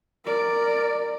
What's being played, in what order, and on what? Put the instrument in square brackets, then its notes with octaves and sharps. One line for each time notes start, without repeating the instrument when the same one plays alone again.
[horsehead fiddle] A#4 D5